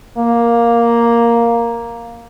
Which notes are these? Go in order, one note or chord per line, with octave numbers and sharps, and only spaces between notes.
A#3